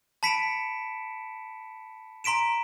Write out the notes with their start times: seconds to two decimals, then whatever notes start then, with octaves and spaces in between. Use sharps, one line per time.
0.23 A5 B5 B6 C#7 D7 E7
2.24 A#5 C6 B6 D7 E7